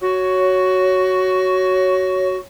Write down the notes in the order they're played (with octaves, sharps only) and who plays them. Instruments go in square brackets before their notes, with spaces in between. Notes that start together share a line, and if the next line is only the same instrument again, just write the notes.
[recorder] F#4 [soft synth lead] C#5